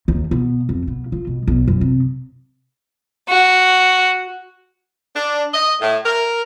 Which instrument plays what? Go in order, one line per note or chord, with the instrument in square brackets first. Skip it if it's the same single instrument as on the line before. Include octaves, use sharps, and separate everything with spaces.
[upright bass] D#2
B2
F2
B2
F4
B2
B1
F#2
C3
[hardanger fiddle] F#4
[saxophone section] D4
D#5
A2
A#4